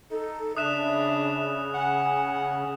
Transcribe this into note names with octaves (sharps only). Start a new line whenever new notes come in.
D#4 A4
C#3 D4 E5 D#6 F#6 E7
F#5 G#5